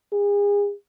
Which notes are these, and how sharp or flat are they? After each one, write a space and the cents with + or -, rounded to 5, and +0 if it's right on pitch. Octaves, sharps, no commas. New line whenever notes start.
G#4 -35